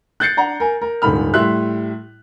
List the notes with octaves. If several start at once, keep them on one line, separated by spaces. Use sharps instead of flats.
F#6 G6 A6 C7 C#7
D4 F#5 A#5
A#4 G#5
A#4
D#1 G#2 D3 B5 F6
A2 G3 E4 E5 C6 F#6